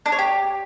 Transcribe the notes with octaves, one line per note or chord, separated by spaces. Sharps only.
D4
C#5
G4